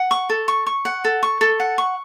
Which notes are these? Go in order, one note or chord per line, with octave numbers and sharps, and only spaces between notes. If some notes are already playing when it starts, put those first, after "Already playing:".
Already playing: F#5
C#6
A4
C#6
C#6
F#5
A4
C#6
A4
F#5
C#6